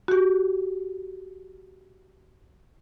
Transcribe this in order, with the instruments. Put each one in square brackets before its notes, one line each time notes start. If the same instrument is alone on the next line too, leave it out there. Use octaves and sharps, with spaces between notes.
[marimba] F#4 G4